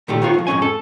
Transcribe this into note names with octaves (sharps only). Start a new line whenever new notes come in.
A#2 D#3 A3 G4
D#3 B3 F4 C#5
A2 F3
F2 G#2 E3 C#4 G#5
A4